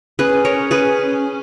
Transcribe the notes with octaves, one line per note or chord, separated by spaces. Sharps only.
C#4 G#4 B4
A#4 C#5
G#4 B4